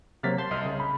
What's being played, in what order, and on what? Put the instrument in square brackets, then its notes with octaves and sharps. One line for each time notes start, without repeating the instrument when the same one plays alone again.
[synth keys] C3 F#3 A#3 [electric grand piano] F6 A6 B6
[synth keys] A5 C6 [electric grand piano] G6
[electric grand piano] C2 D#5 F6 [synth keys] C6
[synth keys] C#3 [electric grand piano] G#4
[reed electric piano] B5